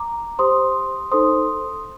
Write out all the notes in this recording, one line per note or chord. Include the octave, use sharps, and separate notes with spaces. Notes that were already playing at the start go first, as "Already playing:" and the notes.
Already playing: A#5 D6
G4 C5 C6 D#6
D#4 A4 C5 C6 D#6